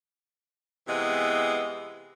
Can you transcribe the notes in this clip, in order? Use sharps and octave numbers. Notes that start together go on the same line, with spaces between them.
C3 E3 G#3 B3